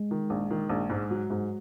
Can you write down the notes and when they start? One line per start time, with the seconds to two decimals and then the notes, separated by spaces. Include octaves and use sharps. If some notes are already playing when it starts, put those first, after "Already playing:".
Already playing: G#3
0.11 D#3
0.30 A#1
0.51 D#3
0.70 A#1
0.90 G#2
1.11 F#3
1.30 G#2